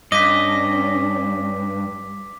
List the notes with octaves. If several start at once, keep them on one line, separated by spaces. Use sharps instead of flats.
G2 C#4 D4 D#5 D6 B6